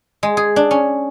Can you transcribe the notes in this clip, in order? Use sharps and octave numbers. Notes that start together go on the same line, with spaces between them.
G#3
G#4
D4
C#4